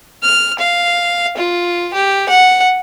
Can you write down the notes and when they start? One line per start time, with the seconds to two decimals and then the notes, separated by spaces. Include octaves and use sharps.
0.23 F6
0.59 F5
1.37 F4
1.94 G4
2.29 F#5